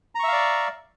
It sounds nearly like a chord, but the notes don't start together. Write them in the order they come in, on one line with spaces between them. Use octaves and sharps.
A#5 C#6 E5 F5 D5